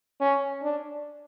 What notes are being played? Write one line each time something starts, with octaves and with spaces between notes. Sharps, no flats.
C#4
D4